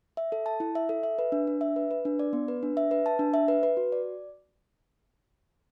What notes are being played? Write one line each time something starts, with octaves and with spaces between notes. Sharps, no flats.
E5
A4
A5
E4
E5
A4
E5
B4
D4
D4
E5
B4
B4
D4
D5
B3
B4
D4
E5
B4
A5
D4
E5
B4
B4
F#4
D5